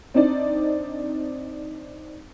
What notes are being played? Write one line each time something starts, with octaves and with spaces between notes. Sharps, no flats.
C4 D4 D#4 D5